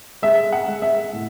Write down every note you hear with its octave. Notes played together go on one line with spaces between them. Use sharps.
G#3 E5
F#5
G#3
E5
A2